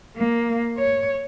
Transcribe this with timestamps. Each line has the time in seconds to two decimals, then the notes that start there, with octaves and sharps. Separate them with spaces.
0.17 A#3
0.78 C#5